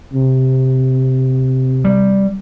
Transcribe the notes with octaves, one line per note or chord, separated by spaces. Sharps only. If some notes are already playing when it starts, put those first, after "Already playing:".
C3
G3